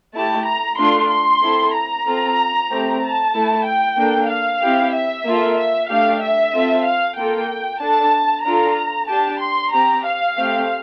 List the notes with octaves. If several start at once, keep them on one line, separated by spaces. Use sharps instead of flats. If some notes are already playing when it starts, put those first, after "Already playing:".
A3 E4 G4 A5
A#5
A3 D4 F4 A4 C6
C6
C4 E4 A4
A#5
C4 F4 A4
A3 C4 G4
A5
A3 E4 A4
G5
A#3 D4 A4
F5
C4 E4 G4
E5
A#3 F4 A4
E5
A3 D4 G4 F5
E5
C4 F4 A4
F5
A#3 F4 A4 G5
D4 A4 A5
D4 F4 A4 A#5
D4 G4 A5
C6
C4 G4 A#5
F5
A3 C4 G4